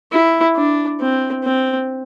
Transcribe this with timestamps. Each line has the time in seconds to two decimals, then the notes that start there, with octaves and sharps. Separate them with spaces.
0.12 E4
0.56 D4
1.00 C4
1.44 C4